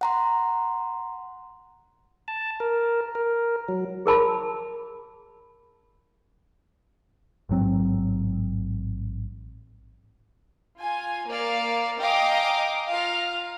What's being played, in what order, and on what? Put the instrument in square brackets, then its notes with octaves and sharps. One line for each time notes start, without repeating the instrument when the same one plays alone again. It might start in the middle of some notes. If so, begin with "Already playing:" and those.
[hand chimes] F#5 A#5 C6
[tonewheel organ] A5
A#4
A#4
F#3
[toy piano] G#4 A#4 A5 B5
[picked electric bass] A1 G#2 F#3 C4
[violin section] F4 G#5
A#3 D5 F5
D#5 F5 G5 G#5 A#5 D6
F4 F5 A#5